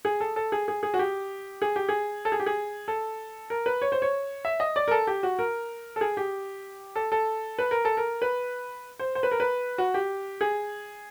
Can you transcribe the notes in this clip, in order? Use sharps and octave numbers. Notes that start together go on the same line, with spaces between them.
G#4
A4
A4
G#4
G#4
G#4
F#4
G4
G#4
G4
G#4
A4
G#4
G4
G#4
A4
A#4
B4
C#5
C5
C#5
E5
D#5
D5
A#4
A4
G4
F#4
A#4
A4
G#4
G4
A4
A4
B4
A#4
A4
A#4
B4
C5
C5
B4
A#4
B4
F#4
G4
G#4